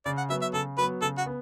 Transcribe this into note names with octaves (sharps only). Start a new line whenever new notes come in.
C#3 D5
F#5
F#3 B3 E5
E5
C#3 A4
F#3 B3 B4
C#3 A4
F#4
B3